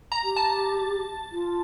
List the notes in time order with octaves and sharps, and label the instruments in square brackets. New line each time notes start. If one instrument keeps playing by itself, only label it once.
[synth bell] A#5
[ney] G4
[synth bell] A5
[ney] F4